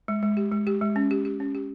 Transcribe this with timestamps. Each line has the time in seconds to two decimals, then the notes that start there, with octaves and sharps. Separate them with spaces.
0.08 G#3
0.23 G#3
0.37 G4
0.52 G#3
0.67 G4
0.81 G#3
0.96 C#4
1.11 G4
1.25 G4
1.40 C#4
1.55 G4